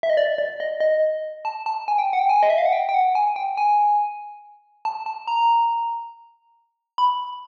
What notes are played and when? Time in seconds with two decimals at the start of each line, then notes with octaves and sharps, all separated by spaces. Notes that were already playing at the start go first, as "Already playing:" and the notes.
0.03 E5
0.10 D#5
0.17 D5
0.38 D5
0.60 D#5
0.80 D#5
1.45 A5
1.66 A5
1.88 G#5
1.98 G5
2.13 F#5
2.19 G5
2.29 G#5
2.43 D#5
2.50 E5
2.58 F5
2.65 F#5
2.73 G5
2.89 G5
2.94 F#5
3.15 G#5
3.36 G5
3.57 G#5
4.85 A5
5.06 A5
5.27 A#5
6.98 B5